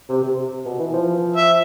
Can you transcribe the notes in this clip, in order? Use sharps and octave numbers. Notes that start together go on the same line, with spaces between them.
C3
C3
B2
E3
F3
E5